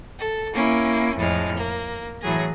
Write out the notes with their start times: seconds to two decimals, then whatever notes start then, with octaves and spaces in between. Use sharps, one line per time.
0.18 A4
0.54 A#3 C#4 E4
1.17 F2 A2 G#3 F6
1.56 A#3
2.22 A2 E3 F#3 G#4 A#6